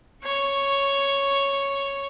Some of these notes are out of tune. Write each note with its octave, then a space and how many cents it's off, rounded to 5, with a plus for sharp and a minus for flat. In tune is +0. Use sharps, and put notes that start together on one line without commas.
C#5 +0 C#6 -10